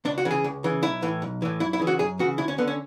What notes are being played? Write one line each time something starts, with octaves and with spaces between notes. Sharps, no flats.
C#2 D4
F#4
C#3 E3
G#4
C#2
C#3 E3
B1 E4
A2 E3
B1
A2 E3
F#2 E4
E4
C#3 E3
F#4
F#2 G#4
C#3 E3 F#4
D2 E4
C#4
D3 B3
C#4